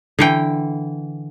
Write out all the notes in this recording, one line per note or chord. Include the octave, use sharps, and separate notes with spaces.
D3 E3 G5